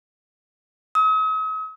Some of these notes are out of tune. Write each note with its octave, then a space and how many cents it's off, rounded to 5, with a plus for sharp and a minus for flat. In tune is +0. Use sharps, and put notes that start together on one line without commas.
D#6 +45